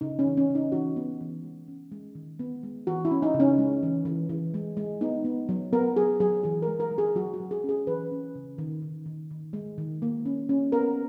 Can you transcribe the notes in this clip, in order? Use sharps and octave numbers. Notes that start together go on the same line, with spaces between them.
C#3 D#4
C#4
E3
C#4
C#3
D#4
E3 F#4
B3
E3
G#3
C#4
G#3
D#3
B3
G#3
E3 F#4
E4
C#4
D#4
C#3
C#4
G#3
E3
E3
E3
G#3
G#3
B3 D#4
B3
F#3
B3 A#4
F#3 G#4
F#3 G#4
E3 G#4
G#3 A#4
A#4
G#3
G#4
F#3 F#4
F#4
F#3
G#4
C#4 G#4
E3 B4
C#4
C#3
D#3
D#3
D#3
D#3
G#3
D#3
A#3
C#4
C#4
B3 A#4